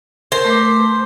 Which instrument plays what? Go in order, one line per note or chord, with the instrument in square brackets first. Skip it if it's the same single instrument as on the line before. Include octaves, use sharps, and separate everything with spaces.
[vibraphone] A#4 [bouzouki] C5
[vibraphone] A3 B4 D6